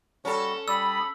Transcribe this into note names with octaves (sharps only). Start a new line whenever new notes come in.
G3 C#4 F#4 A4
G3 D5 B5 D#6 E6